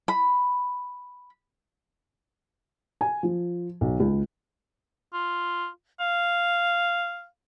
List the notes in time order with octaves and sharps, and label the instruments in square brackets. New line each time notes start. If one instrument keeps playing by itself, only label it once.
[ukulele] B5
[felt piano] G#5
F3
B1
C#2
[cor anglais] F4
F5